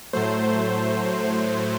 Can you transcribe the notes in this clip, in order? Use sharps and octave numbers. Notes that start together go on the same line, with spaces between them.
A2 F#3 A3 C5